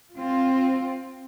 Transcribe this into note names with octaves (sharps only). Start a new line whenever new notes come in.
C4 F4